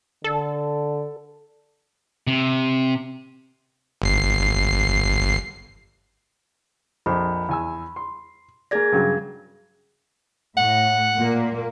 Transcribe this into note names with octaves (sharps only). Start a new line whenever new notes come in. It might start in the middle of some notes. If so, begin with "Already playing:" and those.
D3 A4
C3
G1 C7
A#1 F2 C5 B5
E2 G#5 E6
C6
A#3 G#4 D5 G#6 A#6
G2 C#3 F#3
A2 F#5
A#2 A#3